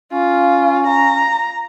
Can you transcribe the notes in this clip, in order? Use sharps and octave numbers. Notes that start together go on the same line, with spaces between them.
C#4 F4
A#5